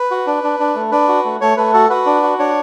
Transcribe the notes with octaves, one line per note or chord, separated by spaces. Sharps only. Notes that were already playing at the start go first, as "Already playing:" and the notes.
Already playing: B4
F#4
D4
D4
D4
A3
D4 B4
F#4
A3
A3 C#5
A3 B4
F#4 A4
F#4 B4
D4
F#4
D4 C#5